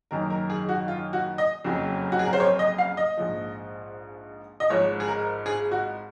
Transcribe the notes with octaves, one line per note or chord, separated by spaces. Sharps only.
F#1 F#2 D#3 A#4
A#4
G#4
F#4
F4
F#4
D#5
F#1 F2 C#3 F#3
F#4
G#4
A#4
C5
C#5
D#5
F5
D#5
A#1 G#2 F3
D#5
G#1 G#2 F3 C#5
G#4
A#4
G#4
F#4